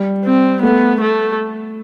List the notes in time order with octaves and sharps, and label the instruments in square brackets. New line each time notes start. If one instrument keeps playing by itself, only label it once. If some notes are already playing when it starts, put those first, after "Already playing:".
Already playing: [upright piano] G3
[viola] C4
[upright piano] A3 [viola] B3
[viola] A3